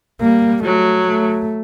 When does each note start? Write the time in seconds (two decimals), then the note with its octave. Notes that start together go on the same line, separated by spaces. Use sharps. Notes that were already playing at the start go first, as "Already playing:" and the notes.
0.20 G3 A#3
0.64 F#3 A3
1.08 A3